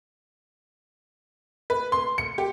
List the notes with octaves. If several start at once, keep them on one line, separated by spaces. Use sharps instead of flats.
B4
C6
C#7
G4